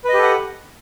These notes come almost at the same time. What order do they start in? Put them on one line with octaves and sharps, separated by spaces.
B4 D#5 G4 A4 F#5